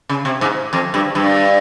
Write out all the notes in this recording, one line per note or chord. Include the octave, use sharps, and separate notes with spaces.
C#3
C3
G#2
F2
G2
G2